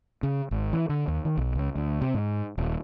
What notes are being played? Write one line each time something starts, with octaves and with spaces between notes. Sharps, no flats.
C#3
G#1
E3
D3
D#2
D#3
B1
C#2
D2
C3
G#2
D#1